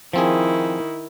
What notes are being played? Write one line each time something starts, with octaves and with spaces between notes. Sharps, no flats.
D#3 F3 C4 E4 G#4